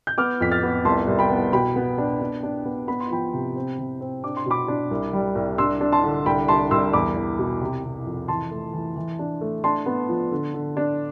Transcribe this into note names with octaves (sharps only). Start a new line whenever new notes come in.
G6
B3 D6 F6
F2 B6
F6 A6
B3
C2 A5 C6
C2
G5 B5
B3
B2 G5 B5
B3
D4
D4
D4
B3
B3 B5
C6
F3 G5 B5
C3
C4
C3
C4
D4 D6
C6
B2 B5 D6
D4
C2
G3
C2
D4 C6 E6
D4
A5 C6
D3
C2 G5 B5
C2 A5 C6
C2 C6 E6
E2 B5 D6
E2
B2
C3
C3
F2
E3 A5 C6
A3
E3
E3
D4
A3
D4 A5 C6
B3
F3
D3
D3
D4